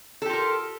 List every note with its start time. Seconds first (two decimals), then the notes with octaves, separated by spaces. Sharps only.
0.22 A4
0.26 G4
0.29 F4
0.33 A#4